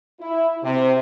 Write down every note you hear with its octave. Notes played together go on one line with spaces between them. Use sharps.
E4
C3